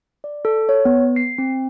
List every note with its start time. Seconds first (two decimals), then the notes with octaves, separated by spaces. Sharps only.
0.24 D5
0.45 A4
0.69 C#5
0.85 B3
1.16 C7
1.38 C4